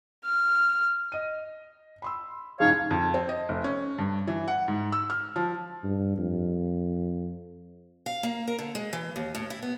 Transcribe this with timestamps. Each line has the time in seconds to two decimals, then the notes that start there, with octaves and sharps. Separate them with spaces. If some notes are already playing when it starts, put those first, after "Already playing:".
0.25 F6
1.12 D#5 D#7
2.02 B5 C6 E6
2.60 A1 C#3 F3 D#4 G#4 C#5 F5
2.91 F2
3.14 C4
3.29 D#5
3.49 F1
3.64 C#4
3.98 G2
4.27 E3
4.48 F#5
4.68 G#2
4.92 E6
5.10 F6
5.36 F3
5.84 G2
6.18 F2
8.06 F5
8.23 A#3
8.47 A#4
8.59 D3
8.75 G#3
8.93 E3
9.16 D#2
9.35 A2
9.50 E4
9.63 B3